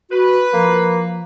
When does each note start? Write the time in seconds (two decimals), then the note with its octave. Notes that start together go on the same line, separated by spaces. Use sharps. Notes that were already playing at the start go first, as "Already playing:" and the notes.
0.11 F#4 B4
0.53 F3 A#3